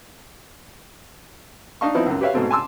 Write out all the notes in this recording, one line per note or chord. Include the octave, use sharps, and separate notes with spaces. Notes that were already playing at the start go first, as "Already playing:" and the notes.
D4 D#4 D#5 F5 A5 C#6
F3 B3 C4 D#4 E4
C#2 F#2
G4 B4 C#5 E5 F5
G#2 B2 A3 C4
G#5 A5 C6 D6 E6